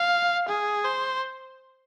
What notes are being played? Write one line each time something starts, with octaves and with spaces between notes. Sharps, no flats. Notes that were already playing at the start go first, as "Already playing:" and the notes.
Already playing: F5
G#4
C5